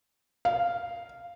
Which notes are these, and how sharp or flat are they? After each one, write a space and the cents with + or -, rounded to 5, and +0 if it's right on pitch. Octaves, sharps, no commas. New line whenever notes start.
F5 -10